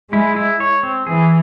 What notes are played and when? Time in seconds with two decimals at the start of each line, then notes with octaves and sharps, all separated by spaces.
0.13 G#3 E4
0.36 E4
0.60 C#5
0.83 C4
1.06 E3 G#4